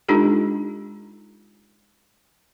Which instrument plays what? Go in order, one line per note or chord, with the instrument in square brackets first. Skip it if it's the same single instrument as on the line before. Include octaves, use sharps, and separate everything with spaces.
[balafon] G#3 D4 D#4 F4 G4 A4